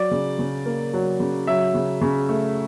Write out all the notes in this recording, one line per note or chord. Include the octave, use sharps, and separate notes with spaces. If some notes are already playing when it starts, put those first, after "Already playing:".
Already playing: F#3 D5
C#3
C#3
A#3
F#3
C#3
F#3 E5
C#3
C#3
A3